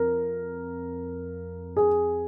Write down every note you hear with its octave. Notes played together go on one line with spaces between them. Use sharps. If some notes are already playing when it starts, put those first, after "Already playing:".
Already playing: F2 F3 A#4
G#4